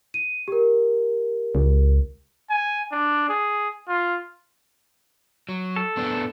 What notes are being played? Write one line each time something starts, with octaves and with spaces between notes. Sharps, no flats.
D#7
G4 A#4
C#2
G#5
D4
G#4
F4
F#3
A4
A2 B3 D4